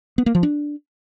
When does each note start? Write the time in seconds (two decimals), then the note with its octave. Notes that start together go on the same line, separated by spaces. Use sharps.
0.18 B3
0.26 A#3
0.35 F3
0.43 D4